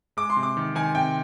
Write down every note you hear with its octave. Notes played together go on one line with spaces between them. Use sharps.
G#3 D6
C6
C3
D6
D#3
D#3 G#5
C3 G5